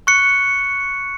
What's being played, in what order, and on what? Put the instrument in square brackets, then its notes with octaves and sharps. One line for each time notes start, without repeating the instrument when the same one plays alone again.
[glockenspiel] C#6 F#6 C#7